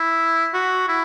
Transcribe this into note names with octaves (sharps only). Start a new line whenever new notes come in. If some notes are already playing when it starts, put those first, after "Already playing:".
Already playing: E4
F#4
E4